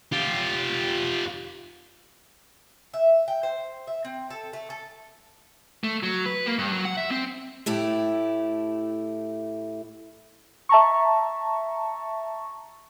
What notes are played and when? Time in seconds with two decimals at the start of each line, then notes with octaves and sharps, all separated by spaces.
0.13 F4 G4
2.94 E5
3.28 G5
3.43 C5
3.87 E5
4.05 C4
4.30 A4
4.53 A3
4.70 A4
5.84 A3
6.03 F#3
6.26 B4
6.46 A#3
6.58 G2
6.72 F#3
6.85 F#5
6.97 E5
7.11 C4
7.66 A2 A3 E4 G4
10.69 E5 A5 A#5 C#6